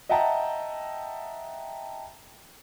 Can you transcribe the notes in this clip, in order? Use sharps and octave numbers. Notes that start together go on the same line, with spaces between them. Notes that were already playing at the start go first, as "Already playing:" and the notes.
D#5 E5 F#5 G5 A5 A#5